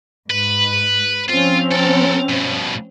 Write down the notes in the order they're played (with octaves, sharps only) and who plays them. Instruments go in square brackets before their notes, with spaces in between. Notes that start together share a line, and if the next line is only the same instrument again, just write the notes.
[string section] G#2 [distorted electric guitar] B4
[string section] F3 C4 C#4 [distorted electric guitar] F4
[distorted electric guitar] A4 A#4
G2 B2